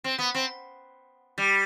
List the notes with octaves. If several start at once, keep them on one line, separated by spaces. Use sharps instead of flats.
C4
B3
C4
G3